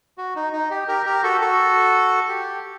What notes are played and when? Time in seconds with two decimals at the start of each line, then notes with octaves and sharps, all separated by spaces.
0.18 F#4
0.36 D#4
0.53 D#4
0.71 G4
0.88 G4 A#4
1.06 G4 A#4
1.23 F#4 A4
1.41 F#4 A4
2.28 G4